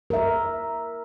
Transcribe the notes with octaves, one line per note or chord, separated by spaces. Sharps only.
A#4 E5